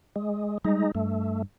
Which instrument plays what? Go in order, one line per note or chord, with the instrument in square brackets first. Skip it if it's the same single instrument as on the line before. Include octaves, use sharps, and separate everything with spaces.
[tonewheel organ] G#3
[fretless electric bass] G3 [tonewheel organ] G#3 D#4
[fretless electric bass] G2 [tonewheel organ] A3